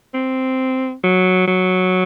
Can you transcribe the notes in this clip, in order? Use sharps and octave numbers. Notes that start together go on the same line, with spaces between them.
C4
F#3
F#3